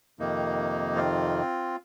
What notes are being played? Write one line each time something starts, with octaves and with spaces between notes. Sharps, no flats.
F2 C3 D#3 A#3 D#4
C4 F4